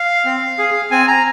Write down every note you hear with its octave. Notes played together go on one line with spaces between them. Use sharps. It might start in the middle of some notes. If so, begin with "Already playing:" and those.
Already playing: F5
C4
G#4
C4 G#5
A#5